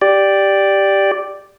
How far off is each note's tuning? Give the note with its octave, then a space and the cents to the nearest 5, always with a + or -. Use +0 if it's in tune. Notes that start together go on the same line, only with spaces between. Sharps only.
G4 +0 D5 +0